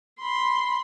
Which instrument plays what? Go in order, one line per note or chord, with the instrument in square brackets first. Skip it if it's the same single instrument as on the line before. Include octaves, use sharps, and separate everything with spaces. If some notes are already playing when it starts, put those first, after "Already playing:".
[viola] B5 C6